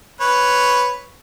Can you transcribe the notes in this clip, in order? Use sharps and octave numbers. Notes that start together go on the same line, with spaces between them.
B4 C#5